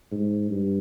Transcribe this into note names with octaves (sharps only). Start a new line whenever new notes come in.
G#2
G2